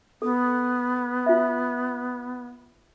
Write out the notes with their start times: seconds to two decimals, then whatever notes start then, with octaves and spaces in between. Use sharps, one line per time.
0.22 B3 A4
1.26 F4 E5